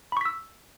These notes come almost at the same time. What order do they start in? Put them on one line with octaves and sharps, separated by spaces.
B5 C#6 B6 E6